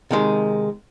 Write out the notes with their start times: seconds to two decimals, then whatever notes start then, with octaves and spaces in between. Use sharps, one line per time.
0.11 C3 D#3 G#3